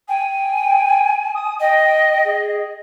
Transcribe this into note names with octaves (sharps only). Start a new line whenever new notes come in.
G5 G#5
D#6
D#5 G5
G5
G#4